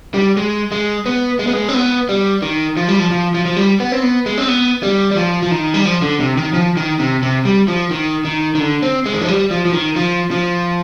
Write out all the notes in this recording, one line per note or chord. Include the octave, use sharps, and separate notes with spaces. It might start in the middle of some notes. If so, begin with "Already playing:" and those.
G3
G#3
G#3
B3
G#3
B3
G#3
C4
B3
G3
D#3
F3
G3
F3
F3
F3
F3
G3
B3
C4
B3
G#3
C4
B3
G3
G3
F3
F3
D#3
G3
F3
D3
C3
D#3
F3
D#3
C3
C3
G3
F3
D#3
D#3
D#3
D3
C4
G#3
D#3
F3
G3
F3
F3
D#3
F3
F3